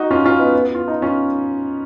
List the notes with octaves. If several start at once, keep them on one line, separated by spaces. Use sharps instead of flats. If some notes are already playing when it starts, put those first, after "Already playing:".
Already playing: D#4 F#4
C#4 F4
C#4 F4
B3 D#4
B3
F4
D#4
C#4 F4